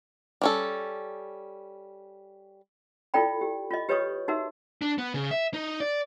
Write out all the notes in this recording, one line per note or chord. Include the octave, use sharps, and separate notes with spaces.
G3 C#4 A4
E4 F4 A4 D5 G5 B5
G4
F4 D#5
G4 B4 C#5 D#5 C#6 D#6
D#4 F#4 A#4 E5
D4
B3
C#3
E5
D#4
D5